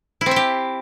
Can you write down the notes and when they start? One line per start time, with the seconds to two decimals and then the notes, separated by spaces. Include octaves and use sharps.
0.21 E4
0.26 C4
0.31 E5
0.36 G4